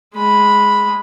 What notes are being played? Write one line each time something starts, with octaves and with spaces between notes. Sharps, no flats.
G#3 B5